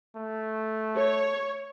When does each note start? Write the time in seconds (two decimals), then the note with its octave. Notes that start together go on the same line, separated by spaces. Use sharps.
0.16 A3
0.97 C#5